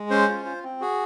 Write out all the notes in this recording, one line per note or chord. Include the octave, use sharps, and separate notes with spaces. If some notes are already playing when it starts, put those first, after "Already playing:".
Already playing: G#3
C#4 C5
F4
F4
C4
F#4 G#4